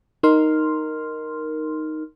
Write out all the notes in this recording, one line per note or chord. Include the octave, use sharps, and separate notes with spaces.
D#4 A#4 C6 F6